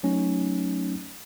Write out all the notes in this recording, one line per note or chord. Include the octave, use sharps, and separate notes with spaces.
F#3 A3 C#4 D#4